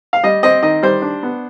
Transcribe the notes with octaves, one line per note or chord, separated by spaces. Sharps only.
F5
G3 D#5
C4 D#5
D#3 D#5
G3 C5
D4
B3